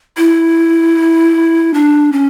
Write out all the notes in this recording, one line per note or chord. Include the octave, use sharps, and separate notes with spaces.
E4
D4
C#4